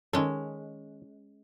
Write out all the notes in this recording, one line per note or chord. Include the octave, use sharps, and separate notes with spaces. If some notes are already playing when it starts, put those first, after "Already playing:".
D#3 G#3 C#4 A4